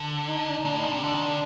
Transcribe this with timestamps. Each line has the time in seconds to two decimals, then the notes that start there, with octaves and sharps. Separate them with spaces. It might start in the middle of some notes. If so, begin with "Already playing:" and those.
Already playing: D3
0.28 D#4
0.40 D#4
0.48 D4
0.52 D#4
0.64 A#2 D4
0.75 A2 D#4
0.84 A#2
0.90 D4
0.93 C3
1.01 D3 D4
1.14 D#3
1.26 D3